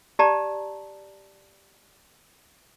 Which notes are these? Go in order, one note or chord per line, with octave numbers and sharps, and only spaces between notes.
G4 D5 A5 A#5